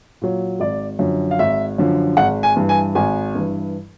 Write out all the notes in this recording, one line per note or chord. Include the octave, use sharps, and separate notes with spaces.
A#2 F#3
G#1 D5
F#2 D3 F3
F5
G#1 E5
F#2 D3 F3
G#1 F#5
G#5
G2 E3
G#5
G#1 G#5
G2 E3